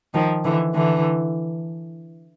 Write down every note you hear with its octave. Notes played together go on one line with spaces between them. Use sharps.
D#3 F3
D3 E3
D3 E3